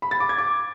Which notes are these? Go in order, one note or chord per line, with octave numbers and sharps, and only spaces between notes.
B5
A6
D6
G#6
D6